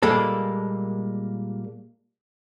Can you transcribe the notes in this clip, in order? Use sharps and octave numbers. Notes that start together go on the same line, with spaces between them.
A#2 G3 G#3 A#3 A4